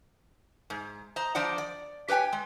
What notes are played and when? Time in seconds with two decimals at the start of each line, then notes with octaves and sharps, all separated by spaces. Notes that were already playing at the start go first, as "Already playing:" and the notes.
0.70 G#2
1.16 C5 D#5 A#5
1.35 F3 D4 C5 D5 D#5 F#5
1.58 D5
2.08 G4 B4 C#5 G5 G#5
2.33 G#3